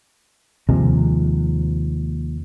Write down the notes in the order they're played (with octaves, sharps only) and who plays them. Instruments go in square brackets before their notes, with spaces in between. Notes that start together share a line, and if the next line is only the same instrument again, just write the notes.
[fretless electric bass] D#2 C3 F3 G#3